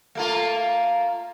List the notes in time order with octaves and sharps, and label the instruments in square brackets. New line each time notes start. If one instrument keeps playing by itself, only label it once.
[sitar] A3 A#3 F4